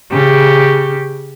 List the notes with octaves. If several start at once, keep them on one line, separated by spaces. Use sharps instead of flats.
C#3 G4